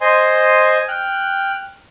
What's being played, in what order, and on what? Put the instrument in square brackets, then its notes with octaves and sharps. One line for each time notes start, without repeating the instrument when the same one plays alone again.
[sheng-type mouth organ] C5 D#5 G#5 C6
G5 F6 F#6